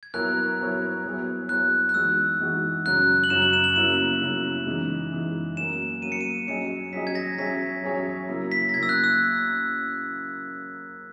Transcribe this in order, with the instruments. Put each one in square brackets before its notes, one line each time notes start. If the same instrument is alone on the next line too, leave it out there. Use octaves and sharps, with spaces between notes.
[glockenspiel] G#6
[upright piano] F#3 B3 E4 A#4 C#5 [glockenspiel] F#6
[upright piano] F#3 B3 E4 A#4 C#5
F#3 B3 E4 G#4 C#5
[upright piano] F#3 B3 E4 G#4 C#5 [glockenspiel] F#6
[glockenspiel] F#6
[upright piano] E3 G#3 D#4 F#4 [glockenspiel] E6
[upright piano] E3 G#3 D#4 F#4
[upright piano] F#2 C#3 F#3 [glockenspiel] F#6
[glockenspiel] F#7
[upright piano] F#2 C#3 F#3 [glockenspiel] E7
[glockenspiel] F#7
E7
F#7
[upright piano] C#3 F#3 A#3 E4 [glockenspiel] E7
[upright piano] C#3 F#3 A#3 E4
C#3 E3 G#3 D#4
C#3 E3 G#3 D#4
[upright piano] F#3 A#3 C#4 [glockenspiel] E7
[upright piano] F#3 A#3 C#4 [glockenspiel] D#7
[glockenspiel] C#7
D#7
[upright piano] F#3 C#4 G#4 D#5 [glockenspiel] C#7
[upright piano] F#3 C#4 G#4 D#5 [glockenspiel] B6
[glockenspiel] G#6
A#6
[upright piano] F#3 C#4 G#4 C#5 E5 [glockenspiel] B6
[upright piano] F#3 C#4 G#4 C#5 E5
C#3 F#3 A#3 E4
[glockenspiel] B6
A#6
[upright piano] C#3 F#3 A#3 E4 [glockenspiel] G#6
[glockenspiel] E6
F#6
E6